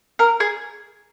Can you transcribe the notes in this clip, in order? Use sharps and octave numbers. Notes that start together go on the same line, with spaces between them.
A#4
G#4